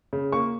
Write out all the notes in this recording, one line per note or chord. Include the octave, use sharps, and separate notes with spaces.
C#3
A#3 C#6